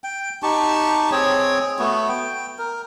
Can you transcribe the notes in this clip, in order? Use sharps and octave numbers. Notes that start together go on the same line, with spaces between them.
G5
D#4 G4 A5 C#6
C4 G#4 C#5
A3 B3 F#4
G5
A#4